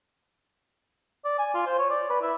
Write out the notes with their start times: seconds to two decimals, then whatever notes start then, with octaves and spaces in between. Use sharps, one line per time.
1.25 D5
1.38 G#5
1.54 F4
1.66 C5
1.79 C#5
1.90 D5
2.10 B4
2.22 E4